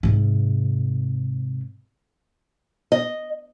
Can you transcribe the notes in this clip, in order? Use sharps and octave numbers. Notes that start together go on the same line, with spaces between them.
G#2 C3
D#5